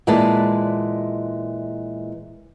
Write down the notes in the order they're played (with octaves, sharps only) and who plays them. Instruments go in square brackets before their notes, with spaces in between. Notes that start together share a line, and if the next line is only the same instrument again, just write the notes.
[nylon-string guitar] A#2 E3 G#3 B4 D5 A5